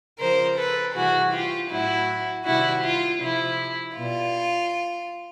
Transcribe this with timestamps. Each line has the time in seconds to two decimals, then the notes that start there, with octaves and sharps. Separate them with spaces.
0.19 C#3 F3 A#4 C5
0.57 A4 B4
0.95 C3 E3 G3 F#4 G#4
1.33 F4 G4
1.70 A2 F#3 E4 F#4
2.46 C3 D#3 G3 E4 F#4
2.83 F4
3.21 C3 F3 E4
3.96 B2 G3 F4